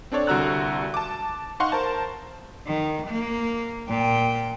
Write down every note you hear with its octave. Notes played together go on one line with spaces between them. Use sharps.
C4 D4 A4 C#5 D5
C2 D3 F#4 A#5 E6 F#6
A5 D6
D#4 F5 F#5 C6 C#6
A#4 C5 A5
D#3
A#3
A#2 G5